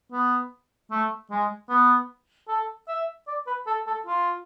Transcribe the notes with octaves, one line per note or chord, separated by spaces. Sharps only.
B3
A3
G#3
B3
A4
E5
D5
B4
A4
A4
F4